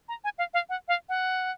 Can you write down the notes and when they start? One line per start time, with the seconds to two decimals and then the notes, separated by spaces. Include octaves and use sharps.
0.08 A#5
0.24 G#5
0.38 F5
0.54 F5
0.69 F#5
0.88 F5
1.09 F#5